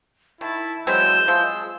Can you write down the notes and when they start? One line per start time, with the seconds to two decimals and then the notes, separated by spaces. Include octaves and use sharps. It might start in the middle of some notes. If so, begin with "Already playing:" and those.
0.41 D#3 E4 A5
0.87 E3 F#3 G#3 C4 E4 E6 G6 E7
1.28 F3 G#3 F4 G#4 E6